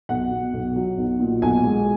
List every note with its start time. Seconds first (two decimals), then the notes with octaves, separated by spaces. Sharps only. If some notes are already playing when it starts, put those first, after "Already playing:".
0.09 B1 F#5
0.31 B2
0.53 B1
0.76 F#3
0.98 B1
1.20 A#2
1.42 B1 G#5
1.65 G#3